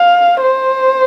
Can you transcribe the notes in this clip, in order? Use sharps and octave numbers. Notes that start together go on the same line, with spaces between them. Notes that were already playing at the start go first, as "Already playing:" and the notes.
Already playing: F5
C5